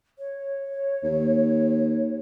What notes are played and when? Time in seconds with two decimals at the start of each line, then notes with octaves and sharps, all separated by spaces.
0.19 C#5
1.03 D#2